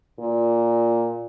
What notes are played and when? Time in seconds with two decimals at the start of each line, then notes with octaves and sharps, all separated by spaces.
0.19 A#2